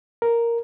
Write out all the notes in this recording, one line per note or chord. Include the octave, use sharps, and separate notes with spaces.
A#4